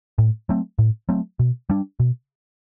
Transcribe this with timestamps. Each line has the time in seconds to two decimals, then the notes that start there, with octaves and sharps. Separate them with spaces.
0.18 A2
0.49 F#3 A3 C4
0.79 A2
1.09 F#3 A3 C4
1.39 B2
1.70 G3 D4
2.00 B2